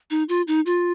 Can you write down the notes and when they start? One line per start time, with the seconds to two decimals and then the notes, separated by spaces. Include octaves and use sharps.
0.10 D#4
0.29 F4
0.48 D#4
0.66 F4